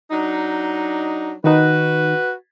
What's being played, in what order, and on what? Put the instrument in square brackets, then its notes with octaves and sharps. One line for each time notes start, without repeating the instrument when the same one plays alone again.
[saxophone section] F#3 D4 D#4
[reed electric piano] D#3 D#4 [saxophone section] F#4 B4